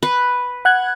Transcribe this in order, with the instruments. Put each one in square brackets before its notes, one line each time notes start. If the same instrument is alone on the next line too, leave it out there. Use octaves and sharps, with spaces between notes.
[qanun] B4
[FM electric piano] F#5 F#6 G#6